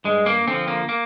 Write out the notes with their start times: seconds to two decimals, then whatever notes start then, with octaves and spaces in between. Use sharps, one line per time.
0.05 G2 G#3
0.26 A#3
0.47 D3 F3 C4
0.68 A#3
0.89 A#3